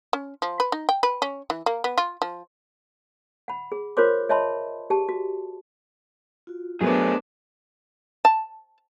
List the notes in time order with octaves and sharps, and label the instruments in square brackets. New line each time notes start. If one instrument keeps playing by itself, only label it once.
[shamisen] C#4
F3
B4
D#4
G5
B4
C#4
E3
A#3
B3
F4
F3
[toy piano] F#5 B5
G#4
F4 A#4 C5 C#5 C6 D6
C#5 D#5 E5 A5 B5 C6
G4 G#4 A5
F#4
[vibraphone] F4 F#4
[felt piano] F#3 [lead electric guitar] A3 G#4 [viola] B3 D4 [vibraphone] A#4 C5 C#5
[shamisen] A5